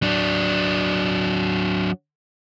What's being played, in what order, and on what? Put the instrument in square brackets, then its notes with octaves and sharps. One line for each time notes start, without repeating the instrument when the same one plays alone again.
[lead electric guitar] F#3 D4